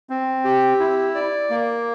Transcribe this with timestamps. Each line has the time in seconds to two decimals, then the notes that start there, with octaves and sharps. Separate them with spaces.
0.10 C4
0.45 G4
0.80 E4
1.15 D5
1.50 A#3